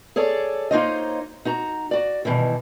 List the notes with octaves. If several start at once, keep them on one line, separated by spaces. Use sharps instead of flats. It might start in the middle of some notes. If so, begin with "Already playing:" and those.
G#4 A4 C#5 D5
A#3 D#4 F4 C5 C#5 D#5
D#4 F#4 A#5
F#4 D5
G2 B2 D#3 E3